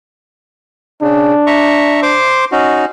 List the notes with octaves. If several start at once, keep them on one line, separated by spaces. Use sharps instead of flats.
C#3 D4
E5 A#5 C#6
C5 C6 D6
C#4 D#4 F#4